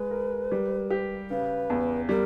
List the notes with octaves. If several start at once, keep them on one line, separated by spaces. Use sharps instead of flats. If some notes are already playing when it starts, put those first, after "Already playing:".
Already playing: G#3 B4
A#4
G3
G4
C#3 B4
E2
G3 A#4